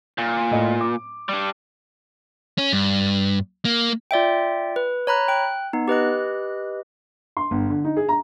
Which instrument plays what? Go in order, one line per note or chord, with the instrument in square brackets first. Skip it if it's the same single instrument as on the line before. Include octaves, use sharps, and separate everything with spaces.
[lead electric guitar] A#2
[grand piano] A2 D#5
D6
[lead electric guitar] G3 D4
C#4
G2
A#3
[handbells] F4 D5 E5 G5
B4
C#5 A#5 B5 F#6
G5 F#6
B3 D#4
G4 B4 D#5 F#6
[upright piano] C6
G1
D3
D#4
G#4
A#5